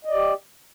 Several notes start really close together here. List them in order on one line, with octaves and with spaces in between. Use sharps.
D#5 D5 G4